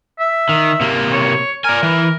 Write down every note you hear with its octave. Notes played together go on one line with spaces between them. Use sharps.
E5
D#3
C3 A#3
C#5
A#4 D5 G#5
E3